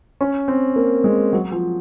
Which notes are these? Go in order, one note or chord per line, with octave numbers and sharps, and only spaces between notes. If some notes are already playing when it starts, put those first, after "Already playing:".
C#4
C4
A#3
G#3
F#3
F3